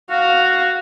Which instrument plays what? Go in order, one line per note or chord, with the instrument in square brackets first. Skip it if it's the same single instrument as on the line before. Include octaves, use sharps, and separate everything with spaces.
[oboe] F#4 [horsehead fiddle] F5